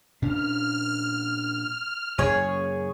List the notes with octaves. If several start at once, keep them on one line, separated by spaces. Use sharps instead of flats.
A#2 C#4 D4 F6
F#2 C#3 A#3 G#4 C#5